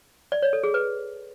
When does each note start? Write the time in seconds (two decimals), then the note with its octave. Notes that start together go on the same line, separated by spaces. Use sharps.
0.32 D5
0.42 C#5
0.53 A4
0.64 G#4
0.74 B4